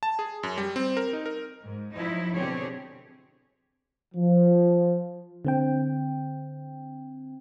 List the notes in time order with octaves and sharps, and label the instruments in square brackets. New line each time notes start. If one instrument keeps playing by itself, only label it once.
[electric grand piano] A5
G#4
F#2
G3
C4
A#4
D#4
A#4
[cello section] G#2
F3 F#3 D#4 E4
B2 D3 C4 G4 G#4 C#5
[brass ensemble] F3
[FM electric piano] D3 C4 G5